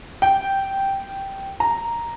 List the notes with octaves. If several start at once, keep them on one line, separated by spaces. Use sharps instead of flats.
G5
A#5